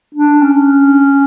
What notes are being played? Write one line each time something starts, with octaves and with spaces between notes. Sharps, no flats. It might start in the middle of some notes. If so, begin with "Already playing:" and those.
D4
C#4